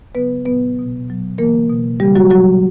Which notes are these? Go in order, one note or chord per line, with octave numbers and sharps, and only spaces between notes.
C#3 F#3 B3 B4
A#2 F#3 B3 B4
B2 F#3
B2 F#3
C#3 E3 A#3 A#4
B2 F#3
C#3 E3 G3 G4
F#3 F#4
A#2 F#3 F#4